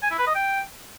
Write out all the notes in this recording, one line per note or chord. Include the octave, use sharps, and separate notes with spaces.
G#5
E4
B4
D#5
G5